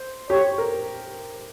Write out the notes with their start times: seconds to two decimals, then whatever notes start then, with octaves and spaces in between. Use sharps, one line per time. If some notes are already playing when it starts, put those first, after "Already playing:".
Already playing: C5
0.30 G4 C#5
0.58 A#4